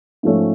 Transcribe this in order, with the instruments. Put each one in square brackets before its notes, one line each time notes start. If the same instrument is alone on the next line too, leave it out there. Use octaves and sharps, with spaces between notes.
[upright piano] G#2 F3 A3 C#4